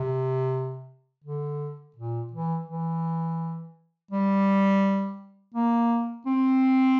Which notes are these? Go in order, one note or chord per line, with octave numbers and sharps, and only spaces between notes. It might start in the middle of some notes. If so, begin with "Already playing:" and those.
Already playing: C3
D3
A#2
E3
E3
G3
A#3
C4